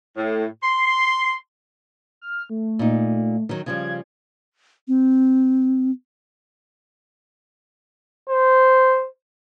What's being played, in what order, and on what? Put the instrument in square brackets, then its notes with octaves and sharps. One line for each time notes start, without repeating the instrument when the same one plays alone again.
[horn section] A2
C6
[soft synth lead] F6
A3
[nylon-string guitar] A#2 D#4
D#3 F#3
[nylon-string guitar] C#3 F3 G3 [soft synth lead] G#6
[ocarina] C4
[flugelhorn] C5